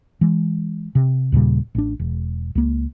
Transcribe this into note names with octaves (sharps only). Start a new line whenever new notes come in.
E3 G#3
C3
D#2 A#2 C#3 G3
A1 D4
E1
C#2 A#3